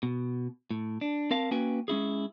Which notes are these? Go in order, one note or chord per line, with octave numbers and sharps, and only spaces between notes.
B2
A2
D4
C4 A#4 F5 A5
A#3 C#4 F#4 B4 G5 G#5
G#3 C#4 E4 G#4